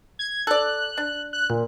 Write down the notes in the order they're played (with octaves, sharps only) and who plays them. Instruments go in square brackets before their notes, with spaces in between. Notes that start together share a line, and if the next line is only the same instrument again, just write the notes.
[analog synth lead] G#6
[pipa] A4 D5 [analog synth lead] F#6
[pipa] D4
[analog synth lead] F#6
A#2